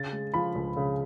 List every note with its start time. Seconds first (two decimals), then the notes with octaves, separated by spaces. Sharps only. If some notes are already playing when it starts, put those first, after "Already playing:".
Already playing: C#3 A6
0.12 G#3
0.34 F3 B5
0.55 C#2
0.77 C#3